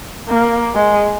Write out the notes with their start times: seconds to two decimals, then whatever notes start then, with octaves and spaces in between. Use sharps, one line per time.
0.29 A#3
0.75 G#3